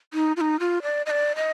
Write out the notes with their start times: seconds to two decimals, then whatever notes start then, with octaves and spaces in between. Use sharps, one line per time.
0.14 D#4
0.37 F4
0.41 D#4
0.60 F4
0.83 D5
1.06 D#5
1.11 D5
1.36 D#5